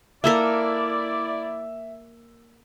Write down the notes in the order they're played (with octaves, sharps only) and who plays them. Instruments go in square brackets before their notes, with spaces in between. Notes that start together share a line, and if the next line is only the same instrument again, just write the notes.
[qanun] A#3 A4 A#4 [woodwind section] E4 D5 [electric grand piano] E5 E6